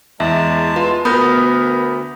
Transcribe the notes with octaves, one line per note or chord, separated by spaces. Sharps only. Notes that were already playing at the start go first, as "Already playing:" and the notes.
E2 G#3 E5 A5
F4 B4
D2 B3 A#4 B5 D#6 G6